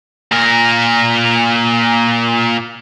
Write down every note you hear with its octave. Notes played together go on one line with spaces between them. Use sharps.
A#2 A#4